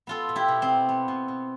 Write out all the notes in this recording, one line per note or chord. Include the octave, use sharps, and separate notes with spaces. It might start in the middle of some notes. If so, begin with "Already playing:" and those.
B3 F4 A4
B2
E4 G4
B2
C4
B3
B3
B2
B2